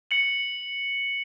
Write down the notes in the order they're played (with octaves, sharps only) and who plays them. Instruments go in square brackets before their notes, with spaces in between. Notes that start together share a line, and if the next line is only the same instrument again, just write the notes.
[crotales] C#7 F#7